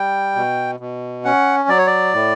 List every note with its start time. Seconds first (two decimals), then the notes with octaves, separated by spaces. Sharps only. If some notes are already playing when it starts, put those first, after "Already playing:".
Already playing: G3 G5
0.36 B2
0.80 B2
1.25 C#4 F#5
1.69 F#3 D5
1.78 C#5
1.87 D5
2.14 A2